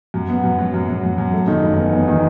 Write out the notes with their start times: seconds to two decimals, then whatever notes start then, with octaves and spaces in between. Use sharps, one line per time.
0.14 F#2
0.29 B3
0.44 F#2
0.58 F#3
0.74 F#2
0.88 F#3
1.04 F#2
1.18 F#2
1.33 A3
1.48 D#3
1.63 F#1
1.78 E2
1.93 E2
2.08 D#3